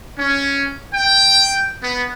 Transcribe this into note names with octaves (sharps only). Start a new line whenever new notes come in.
C#4
G5
B3